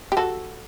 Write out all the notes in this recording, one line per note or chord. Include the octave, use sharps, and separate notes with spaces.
G4
F#4 A4